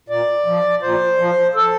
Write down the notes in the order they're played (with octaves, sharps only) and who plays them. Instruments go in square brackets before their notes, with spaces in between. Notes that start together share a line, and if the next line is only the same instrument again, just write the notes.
[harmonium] A#2 D5
F3
A#2 C5
F3
A4